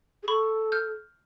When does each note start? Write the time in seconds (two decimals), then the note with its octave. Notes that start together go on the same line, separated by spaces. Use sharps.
0.23 G#4
0.28 A4 B5 C#6
0.72 F6 G6